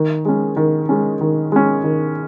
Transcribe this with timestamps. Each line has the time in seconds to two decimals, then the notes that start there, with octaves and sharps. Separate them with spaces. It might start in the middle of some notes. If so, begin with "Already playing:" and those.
Already playing: D#3
0.25 G#3 C#4
0.56 D#3
0.89 G#3 C#4
1.21 D#3
1.52 G#3 C#4
1.84 D#3